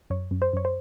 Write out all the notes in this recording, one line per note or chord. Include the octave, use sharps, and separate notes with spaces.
F#2 C#5
F#2
C5
F#2 C#5
C5